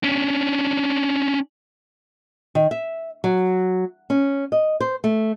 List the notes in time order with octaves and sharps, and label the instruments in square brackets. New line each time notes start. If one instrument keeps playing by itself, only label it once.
[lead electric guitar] C#4 D4
[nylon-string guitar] D#3
E5
F#3
C#4
D#5
C5
A3